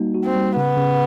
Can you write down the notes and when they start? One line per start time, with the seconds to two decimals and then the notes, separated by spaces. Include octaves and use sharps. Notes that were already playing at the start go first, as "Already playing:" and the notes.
Already playing: G3 A#3 D#4 F#4
0.15 F#4
0.25 C4
0.35 G3
0.56 C#3 B3
0.77 C#3